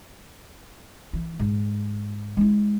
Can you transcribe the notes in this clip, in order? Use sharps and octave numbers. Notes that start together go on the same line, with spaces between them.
E3
G#2
G#3 E4